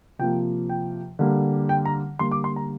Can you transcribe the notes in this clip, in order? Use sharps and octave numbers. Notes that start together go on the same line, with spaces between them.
C3 F3 A#3 G5
G5
D3 G3 A#3
G5
A#5
D3 G3 A#3 C6
D6
C6
A#5